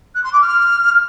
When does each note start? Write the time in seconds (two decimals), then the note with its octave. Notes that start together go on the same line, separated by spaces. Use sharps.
0.15 F#6
0.24 C6
0.33 D6
0.42 F6